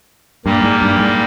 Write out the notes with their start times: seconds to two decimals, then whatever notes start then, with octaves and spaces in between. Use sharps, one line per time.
0.45 G2 A#2 G3 A#3
0.64 G#2
0.82 G2
1.00 G#2